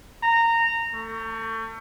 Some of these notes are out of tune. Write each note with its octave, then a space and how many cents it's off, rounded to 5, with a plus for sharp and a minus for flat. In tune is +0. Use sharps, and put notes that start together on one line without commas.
A#5 -15
A3 +35